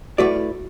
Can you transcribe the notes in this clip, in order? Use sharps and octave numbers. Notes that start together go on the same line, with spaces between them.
A3 E4 F#4 B4 D5